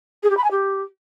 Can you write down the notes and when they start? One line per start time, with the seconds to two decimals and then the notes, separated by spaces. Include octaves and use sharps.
0.23 G#4
0.30 G4
0.37 B5
0.44 G#5
0.51 G4